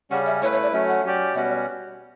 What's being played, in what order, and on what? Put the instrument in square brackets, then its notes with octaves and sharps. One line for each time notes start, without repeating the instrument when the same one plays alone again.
[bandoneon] C#3 G3 C#4 [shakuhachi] F#5
[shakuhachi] E5
[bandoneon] A3 E4 B4 [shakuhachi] C#5
[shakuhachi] C#5
D5
[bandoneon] F#3 A3 C#4 [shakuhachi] E5
[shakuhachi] F#5
[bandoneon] F#3 C#4 G4 D5
[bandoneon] B2 G3 C#4 F#4 [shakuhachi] E5
[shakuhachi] D5